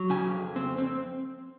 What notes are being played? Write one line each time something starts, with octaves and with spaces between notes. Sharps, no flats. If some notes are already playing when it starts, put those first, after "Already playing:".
Already playing: F#3
C#3 G#5
F2
C4
C4